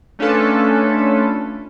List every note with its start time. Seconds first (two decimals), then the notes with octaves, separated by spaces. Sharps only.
0.19 A3 C#4 D4 F4 A4 B4